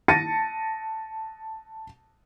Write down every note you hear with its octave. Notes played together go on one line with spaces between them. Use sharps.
A5 A6 A#6 C#7 D#7